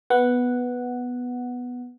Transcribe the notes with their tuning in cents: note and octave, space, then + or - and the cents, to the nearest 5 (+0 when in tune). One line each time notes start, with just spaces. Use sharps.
B3 +0 F#5 +0